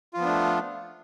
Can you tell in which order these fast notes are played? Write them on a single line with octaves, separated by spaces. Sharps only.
F4 F3 B3 D4 A3